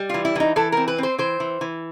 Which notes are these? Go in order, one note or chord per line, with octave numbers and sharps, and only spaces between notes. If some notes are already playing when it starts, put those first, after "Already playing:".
Already playing: G3
E3 F4
E4
E3 D#4
E3 A4
C4 A#4
B4
C4 C5
E3 C5
E3
E3